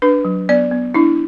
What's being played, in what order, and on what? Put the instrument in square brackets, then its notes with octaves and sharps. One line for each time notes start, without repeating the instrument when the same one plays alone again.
[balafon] D4 B4
F#3
B3 D5
B3
D4 E4